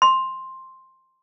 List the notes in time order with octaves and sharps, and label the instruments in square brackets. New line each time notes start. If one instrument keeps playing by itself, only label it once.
[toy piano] C6